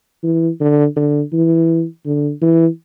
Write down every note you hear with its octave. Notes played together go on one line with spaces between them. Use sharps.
E3
D3
D3
E3
D3
E3